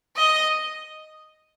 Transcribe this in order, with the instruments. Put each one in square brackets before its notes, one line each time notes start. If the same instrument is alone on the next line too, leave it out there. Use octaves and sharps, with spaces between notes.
[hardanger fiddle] D#5